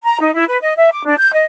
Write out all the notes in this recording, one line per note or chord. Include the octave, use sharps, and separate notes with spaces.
A#5
D#4
E4
B4
D#5
E5
D6
D4
G6
D#5